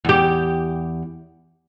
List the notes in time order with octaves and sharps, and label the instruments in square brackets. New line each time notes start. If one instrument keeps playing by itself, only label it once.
[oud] E2 G4